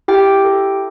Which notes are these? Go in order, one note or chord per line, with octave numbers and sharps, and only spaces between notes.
E4 G4 G5
A4